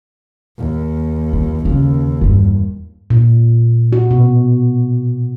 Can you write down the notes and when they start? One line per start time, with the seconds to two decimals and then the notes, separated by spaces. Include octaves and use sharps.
0.58 D#2
1.33 F3
1.65 D#2 C#3
2.21 E2 G2
3.10 A#2
3.93 F#4
4.11 B2